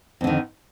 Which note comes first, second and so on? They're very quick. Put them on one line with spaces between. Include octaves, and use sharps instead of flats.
F2 D3 D#3